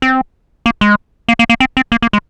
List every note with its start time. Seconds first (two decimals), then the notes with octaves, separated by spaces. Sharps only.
0.02 C4
0.66 A#3
0.81 G#3
1.28 A#3
1.39 A#3
1.49 A#3
1.60 C4
1.77 C4
1.92 A#3
2.02 A#3
2.13 G#3